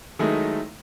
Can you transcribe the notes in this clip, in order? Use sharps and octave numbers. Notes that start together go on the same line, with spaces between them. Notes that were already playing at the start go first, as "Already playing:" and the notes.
D#3 F#3 G#3 A3 D#4 E4